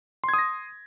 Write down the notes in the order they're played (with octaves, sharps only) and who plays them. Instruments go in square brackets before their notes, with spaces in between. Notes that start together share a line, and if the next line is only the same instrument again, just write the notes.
[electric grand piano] C6
G#6
D#6
A#6